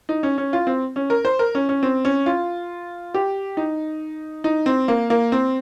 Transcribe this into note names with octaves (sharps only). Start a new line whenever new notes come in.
D#4
C#4
C#4
F4
C4
C#4
A#4
C5
A#4
C#4
C#4
C4
C#4
F4
G4
D#4
D#4
C4
A#3
A#3
C4